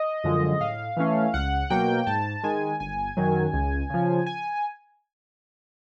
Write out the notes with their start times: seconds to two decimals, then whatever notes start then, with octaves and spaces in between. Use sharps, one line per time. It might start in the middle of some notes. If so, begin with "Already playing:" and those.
Already playing: D#5
0.24 F#2 D3 F3 G#3
0.60 A2 F5
0.97 E3 A3 C#4
1.34 C#2 F#5
1.70 B2 F#3 A#3 G5
2.07 G#2 A5
2.43 D#3 G#3 G#5
2.80 G1 G#5
3.17 F#2 D#3 F#3
3.53 C#2
3.90 C#3 F3
4.26 G#5